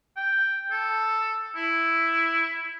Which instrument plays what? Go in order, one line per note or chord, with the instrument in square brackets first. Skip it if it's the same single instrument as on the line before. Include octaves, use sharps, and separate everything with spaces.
[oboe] G5
A4
E4